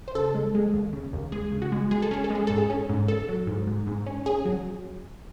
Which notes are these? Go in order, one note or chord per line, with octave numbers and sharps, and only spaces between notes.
C5
C#3 A4
G#3
G#3
D#2
C#3
D#2
G#3 G#4
C#3
F#4
G#3
G#3 G#4
A4
C#4 G#4
A4
G#3 G#4
G#2 A4
G#4
C#4
G#2
G#2 A4
F#3
G#2
G#2
G#2
C#4
C#4 G#4
F#3